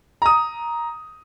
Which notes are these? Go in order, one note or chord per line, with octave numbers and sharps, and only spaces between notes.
A#5 D#6